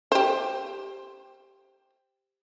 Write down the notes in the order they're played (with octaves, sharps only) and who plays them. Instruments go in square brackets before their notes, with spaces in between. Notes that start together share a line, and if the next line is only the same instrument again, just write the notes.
[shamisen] G4 C5